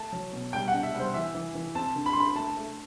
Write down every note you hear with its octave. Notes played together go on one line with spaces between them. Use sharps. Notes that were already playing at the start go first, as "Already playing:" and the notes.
Already playing: A3 A5
F#3
B2
G3 G5
F#5
D4
E5
G3 C5
E3 E5
E3
E3
C4 A5
D3
B5
C6
D3 B5
A3 A5
A3